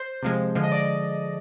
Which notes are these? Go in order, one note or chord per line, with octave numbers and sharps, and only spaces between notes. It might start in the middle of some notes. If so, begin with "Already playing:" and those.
Already playing: C5
C3 F3 G#3
D3 F3 G#3
D#5
D5